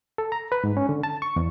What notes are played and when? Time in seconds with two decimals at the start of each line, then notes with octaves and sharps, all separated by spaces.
0.18 A4
0.32 A#5
0.52 B4
0.64 G#2
0.77 C#4
0.89 D3
1.03 A5
1.22 C#6
1.36 E2